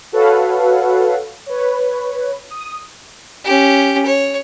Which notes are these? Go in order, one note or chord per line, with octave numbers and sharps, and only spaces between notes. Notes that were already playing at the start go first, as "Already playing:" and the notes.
F#4 A4 B4 C#5 F5 F#5
B4 C#5
D#6
C#4 G4
C#5